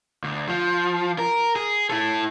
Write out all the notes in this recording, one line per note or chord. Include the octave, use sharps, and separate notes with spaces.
D2
F3
A#4
G#4
E4 A4